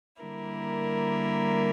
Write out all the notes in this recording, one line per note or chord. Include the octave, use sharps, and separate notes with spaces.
D3 G3 A#3 E4 A#4